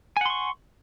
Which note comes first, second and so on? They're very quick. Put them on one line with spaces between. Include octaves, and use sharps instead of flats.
G#5 F#5 C6 C#6